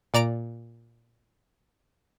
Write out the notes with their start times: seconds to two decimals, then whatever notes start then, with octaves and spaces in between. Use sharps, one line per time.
0.14 A#2 D5 A#5 D7